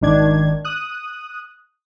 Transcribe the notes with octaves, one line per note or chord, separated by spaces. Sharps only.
G#1 D#3 D4 G#6
D#6 F#6